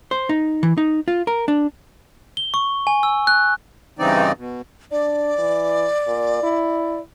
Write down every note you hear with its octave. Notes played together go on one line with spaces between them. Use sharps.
C5
D#4
E3
D#4
F4
A#4
D4
G7
C#6
G#5
E6
F#6
G2 C#3 E3 C4 D#4 D5
B2
D4 D5
E3
A#2
E4